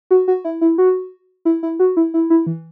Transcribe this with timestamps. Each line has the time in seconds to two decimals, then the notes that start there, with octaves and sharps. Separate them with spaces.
0.11 F#4
0.28 F#4
0.45 E4
0.61 E4
0.78 F#4
1.45 E4
1.63 E4
1.79 F#4
1.97 E4
2.14 E4
2.30 E4
2.47 E3